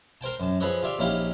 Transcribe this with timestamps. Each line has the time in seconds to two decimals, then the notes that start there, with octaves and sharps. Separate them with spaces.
0.21 A#4 C5 G5 A5
0.40 F#2 A5
0.60 F3 G#4 A4 B4 C#5 D#5
0.83 F4 G4 D5 E5 F5
0.99 A#1 C#4 D#4 E4 G4 F5